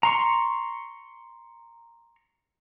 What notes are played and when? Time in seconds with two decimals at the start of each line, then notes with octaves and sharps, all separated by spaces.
0.03 A#5 C6 C#6